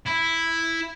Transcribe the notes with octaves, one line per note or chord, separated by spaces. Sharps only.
E4